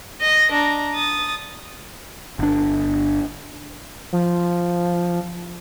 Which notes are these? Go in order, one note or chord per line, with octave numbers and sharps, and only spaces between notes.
D#5 A#6
D4 A#5
D#6 A6
G1 D4
F3